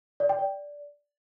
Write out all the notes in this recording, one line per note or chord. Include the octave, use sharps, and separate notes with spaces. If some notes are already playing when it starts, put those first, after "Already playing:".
D5
G5
D5